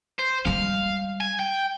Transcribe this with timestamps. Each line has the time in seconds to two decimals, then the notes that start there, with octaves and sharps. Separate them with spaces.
0.19 C5
0.46 G3 G#3 F5
1.21 G#5
1.39 G5